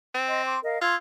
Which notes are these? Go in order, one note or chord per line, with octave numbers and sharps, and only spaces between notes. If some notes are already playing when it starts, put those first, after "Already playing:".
C4
D#5 C6
C6 D6
A#4 D#5 F5
F4 C6 E6 G#6